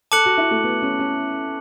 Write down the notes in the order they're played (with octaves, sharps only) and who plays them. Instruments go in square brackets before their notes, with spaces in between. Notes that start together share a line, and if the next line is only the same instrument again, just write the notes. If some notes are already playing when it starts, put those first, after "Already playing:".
[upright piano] A4 [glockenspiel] A5 D6 F#6 C#7 F#7
[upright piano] F#4
E4
A3
B3
C#4
C#4